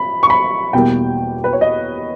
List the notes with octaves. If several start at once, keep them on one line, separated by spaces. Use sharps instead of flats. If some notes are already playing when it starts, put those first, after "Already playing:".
Already playing: A#2 B5
C#6
B5
E2 B2 G3 A#3 G5
B4
C#5
D#5